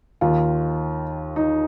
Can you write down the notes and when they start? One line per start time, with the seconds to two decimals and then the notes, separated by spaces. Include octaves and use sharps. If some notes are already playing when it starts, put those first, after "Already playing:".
0.21 D#2 D#3 F4
1.36 D#4